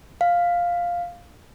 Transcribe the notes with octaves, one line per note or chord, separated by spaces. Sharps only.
F5